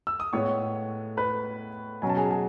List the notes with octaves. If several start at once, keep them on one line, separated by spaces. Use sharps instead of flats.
E6
D#6
A2 G#3 B3 C#5 C#6
B4 B5
B2 F#3 C#4 G#5
A5
G#4 G#5
G#4 G#5